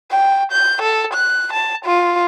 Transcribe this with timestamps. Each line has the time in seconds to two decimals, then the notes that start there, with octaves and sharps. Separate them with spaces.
0.11 G5
0.52 G6
0.82 A4
1.14 F#6
1.53 A5
1.85 F4